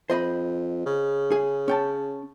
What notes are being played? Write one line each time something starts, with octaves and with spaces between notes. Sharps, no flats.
F2 C5 D#5 B5
C#3
G#4
C#4 G5 A5